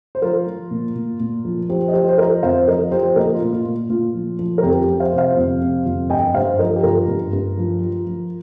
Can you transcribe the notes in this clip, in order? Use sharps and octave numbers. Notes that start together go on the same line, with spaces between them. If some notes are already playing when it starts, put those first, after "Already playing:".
C5
F3 F4 A#4
F3
A#2
A#2
A#2
F3
F3 G4 C5
D#5
F3 G4 C5
C5
F3 A#4 D#5
F2 C5 F5
F3 A#4 D#5
F3 G4 C5
A#2 A#4 D#5
F4
A#2
F4
A#2
A#2 F4
F3
F3
A#4
F2 G4
G4
F3
C5 F5
C3
C5 F5
F2
C3
F2
G2 D#5 G5
G2 C5 F5
F3 A#4 D#5
G4
G2 F4 A#4
G2
G2
F3
F3
F3